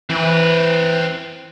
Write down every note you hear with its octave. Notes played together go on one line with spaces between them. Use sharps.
E3 C4 B4